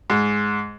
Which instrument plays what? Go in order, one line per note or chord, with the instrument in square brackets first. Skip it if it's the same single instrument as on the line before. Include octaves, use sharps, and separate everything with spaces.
[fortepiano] G#2